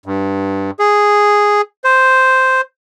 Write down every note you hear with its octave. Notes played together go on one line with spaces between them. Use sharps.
G2
G#4
C5